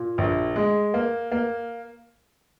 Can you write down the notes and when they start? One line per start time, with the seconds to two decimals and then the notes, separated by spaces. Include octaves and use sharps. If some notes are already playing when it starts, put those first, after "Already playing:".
Already playing: A#2
0.18 A#1
0.56 G#3
0.94 A#3
1.32 A#3